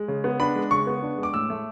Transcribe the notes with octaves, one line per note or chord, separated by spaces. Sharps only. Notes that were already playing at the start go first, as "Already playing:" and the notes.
Already playing: G#3
C#3
B3
D4 B5
G#3
C#3 C#6
B3
D4
G#3
D6
A2 E6
A3